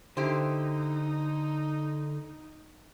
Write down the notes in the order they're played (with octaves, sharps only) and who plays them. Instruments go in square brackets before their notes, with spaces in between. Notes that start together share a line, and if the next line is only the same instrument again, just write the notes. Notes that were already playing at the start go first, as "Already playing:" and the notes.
[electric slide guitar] D3 [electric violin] D#4 [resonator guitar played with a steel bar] E4 G4 C5